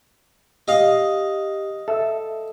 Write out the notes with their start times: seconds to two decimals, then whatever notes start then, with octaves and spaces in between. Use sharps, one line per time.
0.68 G4 D#5 F5
1.88 A4 E5 E6